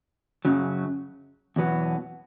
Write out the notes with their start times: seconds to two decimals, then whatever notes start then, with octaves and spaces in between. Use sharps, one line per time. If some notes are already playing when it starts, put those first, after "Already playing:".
0.45 F#2 C#3 F#3
1.56 E2 B2 F#3 B3